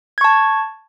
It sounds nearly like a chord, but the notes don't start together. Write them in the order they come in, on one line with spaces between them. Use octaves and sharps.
G#6 C#6 A5